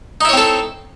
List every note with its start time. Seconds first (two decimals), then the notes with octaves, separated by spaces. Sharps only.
0.21 D#4
0.25 E4
0.29 C#5
0.33 C4
0.37 A4